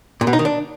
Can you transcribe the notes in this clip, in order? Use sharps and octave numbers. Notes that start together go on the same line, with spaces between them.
A#2
B2
D#4
D#3
D4